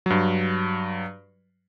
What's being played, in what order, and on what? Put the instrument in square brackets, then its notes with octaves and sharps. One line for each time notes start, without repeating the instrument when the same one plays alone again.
[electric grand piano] G2 F#3